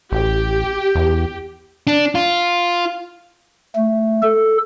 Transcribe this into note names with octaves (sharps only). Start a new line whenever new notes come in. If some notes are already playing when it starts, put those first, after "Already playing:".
A1 G4
E2
D4
F4
A3
A4